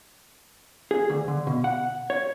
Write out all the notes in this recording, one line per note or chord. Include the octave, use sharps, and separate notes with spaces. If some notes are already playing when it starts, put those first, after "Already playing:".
G#4
D2
D3
B2
F#5
C#5